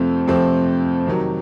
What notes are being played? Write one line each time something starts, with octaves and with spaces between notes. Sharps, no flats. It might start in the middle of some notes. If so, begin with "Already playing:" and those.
Already playing: F2 C3 F3 A3 C4
F2 C3 F3 A3 C4
C3 D#3 F#3